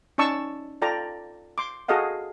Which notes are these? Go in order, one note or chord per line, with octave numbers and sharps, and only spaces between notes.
C#4 D#4 D5 A5 C#6 E6
F4 A4 D5 G5 A#5
C6 D6
F#4 G#4 A4 D#5 F5 F#5